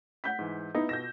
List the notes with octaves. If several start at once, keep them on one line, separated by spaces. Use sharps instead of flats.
F#5 G6 B6
G#2 E3
B3 D#4 E4
B2 F4 G6 A#6 E7